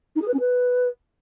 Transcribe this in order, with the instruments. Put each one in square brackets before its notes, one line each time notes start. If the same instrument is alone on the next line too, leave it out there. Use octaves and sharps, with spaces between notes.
[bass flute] D#4
G#4
B4
C#4
B4